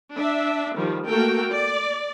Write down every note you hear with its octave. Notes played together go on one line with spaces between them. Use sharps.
D4 E5
D#3 F3 G3
A3 A#3 F#4 A4 A#4 G5
D5